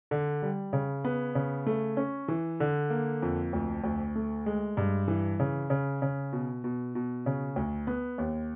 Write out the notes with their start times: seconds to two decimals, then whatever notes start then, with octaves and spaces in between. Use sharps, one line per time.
0.11 D3
0.42 G3
0.73 C#3
1.04 B3
1.35 C#3
1.66 A3
1.97 C#4
2.28 E3
2.60 D3
2.90 A#3
3.22 F2
3.53 D2
3.84 D2
4.15 A3
4.46 G#3
4.77 G2
5.08 E3
5.40 C#3
5.70 C#3
6.02 C#3
6.33 B2
6.64 B2
6.95 B2
7.26 C#3
7.56 D2
7.87 B3
8.18 D#2